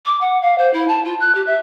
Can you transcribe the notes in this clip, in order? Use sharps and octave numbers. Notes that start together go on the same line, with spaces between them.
D6
F#5
F5
C5
E4
A5
F4
F#6
G4
E5